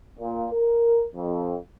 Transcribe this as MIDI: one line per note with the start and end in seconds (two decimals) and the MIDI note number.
0.19 0.46 46
0.52 1.06 70
1.15 1.54 41